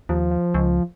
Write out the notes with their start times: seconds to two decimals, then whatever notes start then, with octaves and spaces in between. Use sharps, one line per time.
0.09 D#2 F3
0.31 F3
0.54 C#2